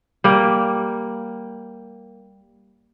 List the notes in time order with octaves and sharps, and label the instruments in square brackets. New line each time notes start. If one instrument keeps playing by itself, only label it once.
[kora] G3 A#3